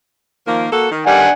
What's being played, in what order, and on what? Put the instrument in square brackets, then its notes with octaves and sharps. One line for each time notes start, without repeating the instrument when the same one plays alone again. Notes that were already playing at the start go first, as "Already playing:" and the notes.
[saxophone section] D#3 F3 A#3
A#3 F#4 A4
D#3
[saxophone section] D3 D#3 G3 [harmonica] D4 F#5 G#5